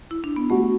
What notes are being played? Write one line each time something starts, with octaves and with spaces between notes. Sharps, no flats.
E4
D4
B3
A3 F#4